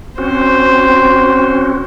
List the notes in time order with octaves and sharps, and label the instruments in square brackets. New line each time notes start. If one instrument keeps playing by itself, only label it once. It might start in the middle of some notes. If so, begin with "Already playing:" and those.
[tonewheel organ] C4 C#4 F#4 [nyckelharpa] C5